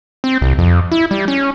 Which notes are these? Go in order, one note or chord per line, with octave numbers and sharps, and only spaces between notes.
C4
C2
F2
E4
G3
C#4